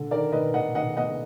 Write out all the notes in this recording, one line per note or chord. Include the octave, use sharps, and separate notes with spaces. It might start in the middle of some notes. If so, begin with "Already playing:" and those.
Already playing: D3
D#3 A#4 D5
D#3 B4 D#5
D#3 D#5 F#5
D#3 D#5 F#5
B3 D#5 F#5